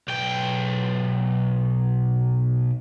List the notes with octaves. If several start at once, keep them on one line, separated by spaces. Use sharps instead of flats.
B1 G5